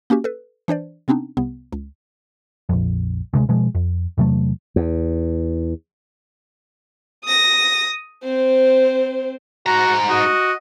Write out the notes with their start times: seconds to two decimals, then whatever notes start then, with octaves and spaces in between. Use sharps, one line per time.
0.10 A#3 C#4 F#4 G4
0.24 A4 B4
0.68 E3 D4 C5 D5
1.08 C3 B3 C4 D4 D#4
1.37 C2 C3 B3
1.73 C#2
2.69 A#1 F2
3.34 D2 C3 G#3
3.49 B2 F3 G#3
3.75 F2
4.18 E2 C3 F#3 A3
4.76 E2
7.24 D#6 A#6
8.23 C4 C5
9.66 G#2 F#4 A#5
10.10 F#4 D#5